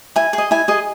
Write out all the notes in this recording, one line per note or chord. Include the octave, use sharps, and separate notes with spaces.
E4 G#5
G#4
D#5
E4 G#5
G#4 D#5